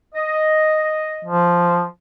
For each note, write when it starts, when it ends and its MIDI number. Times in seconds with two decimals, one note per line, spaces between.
0.13 1.26 75
1.25 1.85 53